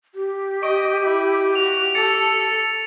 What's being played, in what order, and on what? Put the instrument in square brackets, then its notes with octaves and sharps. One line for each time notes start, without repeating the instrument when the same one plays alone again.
[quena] G4
[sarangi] D#5 [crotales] C#6 D7
[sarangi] E4
[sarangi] F#4 [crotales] F7
[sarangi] A4 [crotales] A6 C#7